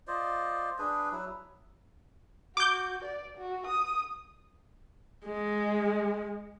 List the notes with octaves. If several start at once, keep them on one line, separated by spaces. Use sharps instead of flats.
F4 C5 D5 D#5
D4 G#4 B4
F#3 E4
F#4 D6 G6
D5
F#4
D#6
G#3